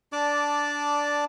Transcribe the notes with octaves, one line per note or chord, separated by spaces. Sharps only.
D4 D5 A5 D6